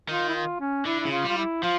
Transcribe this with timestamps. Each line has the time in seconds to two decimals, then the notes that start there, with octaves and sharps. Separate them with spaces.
0.09 D#3 F4
0.29 E4
0.34 F4
0.60 C#4
0.86 D3 E4
1.01 C#3 E4
1.12 F4
1.24 G3 F4
1.37 E4
1.63 F3 F4